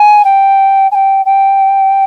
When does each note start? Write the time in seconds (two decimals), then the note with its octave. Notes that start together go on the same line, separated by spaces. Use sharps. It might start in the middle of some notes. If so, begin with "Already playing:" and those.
Already playing: G#5
0.24 G5
0.91 G#5
0.94 G5
1.25 G5